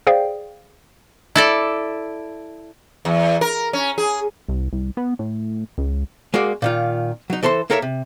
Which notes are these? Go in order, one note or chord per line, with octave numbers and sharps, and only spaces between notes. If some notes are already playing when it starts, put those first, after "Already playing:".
G#4 C5 D5 F5 G5
E4 A4 D5
E2
A#4
C#4
G#4
C2
C2
B3
A2
C#2
G#3 A#3 F#4 D5
A#2 D#3 F4
F#3 D#4
E3 A4 C5 A#5 C6
A#3 A4 A#4 C#5 D5 E5
C3